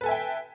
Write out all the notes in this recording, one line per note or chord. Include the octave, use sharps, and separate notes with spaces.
A4 B4 E5 G5 G#5